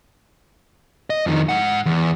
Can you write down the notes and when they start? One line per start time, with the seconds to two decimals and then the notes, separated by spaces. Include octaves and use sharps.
1.10 D#5
1.26 F2 D#3
1.49 G#2 F#5
1.86 E2